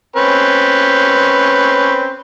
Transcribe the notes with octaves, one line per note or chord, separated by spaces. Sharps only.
C4 C#4 B4